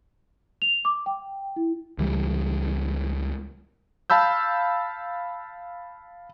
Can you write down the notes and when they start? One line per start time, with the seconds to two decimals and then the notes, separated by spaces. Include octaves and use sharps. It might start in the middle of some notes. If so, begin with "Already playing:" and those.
0.62 F7
0.85 D6
1.06 G5
1.56 E4
1.98 C#2 E3 G3
4.10 F5 A5 B5 E6 G6